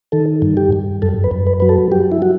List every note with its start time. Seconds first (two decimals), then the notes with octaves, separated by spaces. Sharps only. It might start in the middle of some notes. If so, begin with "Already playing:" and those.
0.12 D#3 A4
0.42 G2
0.57 G4
0.72 G2
1.02 F#2 A4
1.24 B4
1.31 F#2
1.47 B4
1.60 F#3 B4
1.69 A4
1.92 F#3 G4
2.12 E4
2.22 F#3 F#4